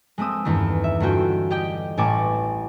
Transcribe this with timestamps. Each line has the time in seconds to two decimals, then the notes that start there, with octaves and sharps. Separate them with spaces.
0.18 G#3 A3 C4 D#6 E6
0.45 E2 G2 D#3 A3
0.84 E5
1.00 G1 A3 F4 F#4 G5
1.50 G4 D#5 G5
1.97 A1 A2 C#5 G#5 A5 D6